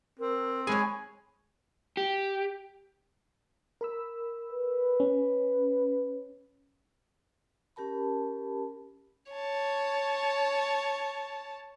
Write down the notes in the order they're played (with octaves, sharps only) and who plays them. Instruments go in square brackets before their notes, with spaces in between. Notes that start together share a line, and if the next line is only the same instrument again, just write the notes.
[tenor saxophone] C4 [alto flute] A#4
[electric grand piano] G#3 G#4 [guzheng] C#5 G#5 [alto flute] B5
[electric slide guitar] G4
[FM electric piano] A#4 B5 E6
[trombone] B4
[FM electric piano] C#4
[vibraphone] C#4 G4 A#4 A5 B5
[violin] C#5 A5